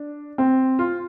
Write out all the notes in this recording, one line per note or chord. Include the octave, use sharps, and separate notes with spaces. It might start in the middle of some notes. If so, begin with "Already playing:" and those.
Already playing: D4
C4
F4